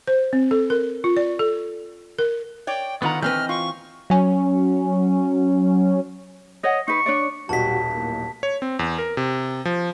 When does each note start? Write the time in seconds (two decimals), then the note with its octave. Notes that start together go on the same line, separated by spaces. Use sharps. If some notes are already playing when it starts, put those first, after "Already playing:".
0.08 C5
0.33 C4
0.51 A4
0.70 A#4
1.04 F4
1.17 D5
1.39 A4
2.19 A#4
2.67 C#5 D5 G5
3.02 D3 D#3 B3 F4 F#5 A#5
3.22 E3 C4 B4 D#5 F6 G6
3.49 F4 C#6
4.10 F#3 C#4
6.64 C#5 D#5 F#5
6.88 D#4 B4 C#6
7.06 D4 C#5 D5
7.49 D#1 B1 G3 D#4 F#4 A5 B6
7.93 A2 A#3
8.43 C#5
8.62 C4
8.79 E2
8.98 A#4
9.17 C3
9.65 F3